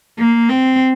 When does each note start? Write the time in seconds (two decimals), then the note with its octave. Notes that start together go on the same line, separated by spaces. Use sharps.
0.18 A#3
0.49 C4